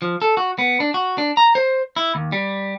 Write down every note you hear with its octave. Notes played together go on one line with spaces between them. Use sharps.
F3
A4
F#4
B3
D4
F#4
D4
A#5
C5
E4
D#2
G3